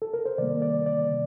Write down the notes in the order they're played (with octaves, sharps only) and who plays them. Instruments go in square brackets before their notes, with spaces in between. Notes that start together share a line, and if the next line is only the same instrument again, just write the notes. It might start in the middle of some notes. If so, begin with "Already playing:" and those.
[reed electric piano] A4
A#4
C5
C3 D#3 G3 A#3 D5
D5
D5
C3